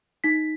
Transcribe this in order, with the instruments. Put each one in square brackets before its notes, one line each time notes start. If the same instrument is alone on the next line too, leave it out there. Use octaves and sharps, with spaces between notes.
[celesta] D#4 B6